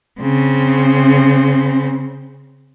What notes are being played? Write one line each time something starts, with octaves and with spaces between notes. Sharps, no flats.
C#3 C4